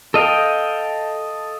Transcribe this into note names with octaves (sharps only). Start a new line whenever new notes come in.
A4 D#5 F5 G5